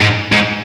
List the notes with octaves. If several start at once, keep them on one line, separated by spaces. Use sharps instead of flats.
G#2
G#2